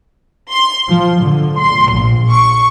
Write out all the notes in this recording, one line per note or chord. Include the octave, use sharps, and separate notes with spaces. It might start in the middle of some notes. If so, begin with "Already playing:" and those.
C6
F3
D3
C6
A#1
C#6